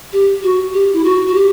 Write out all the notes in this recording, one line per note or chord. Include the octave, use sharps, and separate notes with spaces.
G4
F#4
G4
E4
F#4
F#4
G4